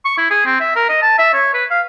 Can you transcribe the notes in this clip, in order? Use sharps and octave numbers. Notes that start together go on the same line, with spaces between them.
C#6
E4
G#4
C4
E5
A#4
D#5
A5
E5
C#5
B4
F5